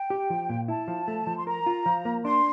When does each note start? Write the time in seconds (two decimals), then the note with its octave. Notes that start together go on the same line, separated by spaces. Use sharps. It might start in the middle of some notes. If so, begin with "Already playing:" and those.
Already playing: G5
0.10 G4
0.30 F3
0.49 A#2
0.68 E4 A5
0.88 F3
1.08 A3
1.27 F3
1.38 C6
1.47 A#4 A#5
1.67 F4
1.86 F3
2.05 A#3
2.24 D4 C6